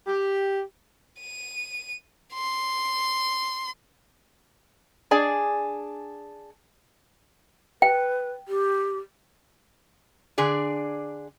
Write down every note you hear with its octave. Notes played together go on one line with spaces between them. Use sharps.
G4
D#7
C6
D4 G#4 D5 G#5
B4 G5
G4
D3 D4 G#4 D5